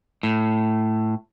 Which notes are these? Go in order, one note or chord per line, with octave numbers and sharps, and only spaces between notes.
A2